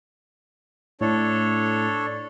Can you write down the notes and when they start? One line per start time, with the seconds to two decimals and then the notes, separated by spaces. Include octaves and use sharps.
1.01 A2 D4 A4 C#5